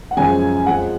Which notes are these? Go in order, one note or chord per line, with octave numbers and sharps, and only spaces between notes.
F#5
F#2 C#3 F3 G#3 G#5
F2 F3 G#3 F#5